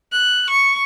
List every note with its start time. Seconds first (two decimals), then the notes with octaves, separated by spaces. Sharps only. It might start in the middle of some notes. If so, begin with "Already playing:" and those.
0.12 F#6
0.50 C#6